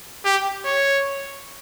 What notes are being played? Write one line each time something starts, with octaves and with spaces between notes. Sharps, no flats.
G4
C#5